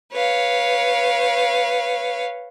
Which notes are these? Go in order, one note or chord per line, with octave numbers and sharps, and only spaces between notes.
B4 C#5 F5